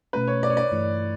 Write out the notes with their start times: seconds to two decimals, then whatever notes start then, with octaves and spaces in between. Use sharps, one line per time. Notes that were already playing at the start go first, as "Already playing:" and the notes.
0.13 B2 A3 C#4 B4
0.27 C#5
0.43 D5
0.50 C#5
0.57 D5
0.72 G2 E3 A3 E4